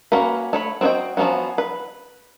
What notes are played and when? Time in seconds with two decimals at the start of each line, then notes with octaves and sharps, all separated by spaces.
0.12 A#3 C#4 F#4 B4
0.53 A3 C#5 B5
0.81 C4 F#4 G#4 D#5 G5
1.17 F3 F#3 B3 C#4 F#4
1.58 B4